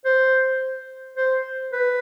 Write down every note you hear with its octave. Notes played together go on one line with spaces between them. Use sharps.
C5
C5
B4